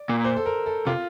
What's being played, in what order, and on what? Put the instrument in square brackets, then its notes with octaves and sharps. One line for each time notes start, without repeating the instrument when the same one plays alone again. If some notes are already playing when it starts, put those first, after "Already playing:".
Already playing: [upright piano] D5
[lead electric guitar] A#2
[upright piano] C5
A4
A#4
A4
[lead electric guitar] C3 [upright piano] F4